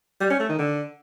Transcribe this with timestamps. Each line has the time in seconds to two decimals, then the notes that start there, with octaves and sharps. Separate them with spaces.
0.21 G3
0.30 C#4
0.40 A3
0.49 D#3
0.59 D3